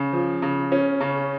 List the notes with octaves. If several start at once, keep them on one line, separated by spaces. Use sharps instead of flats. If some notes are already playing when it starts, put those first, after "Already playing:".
Already playing: C#3
F3
C#3
C#4
C#3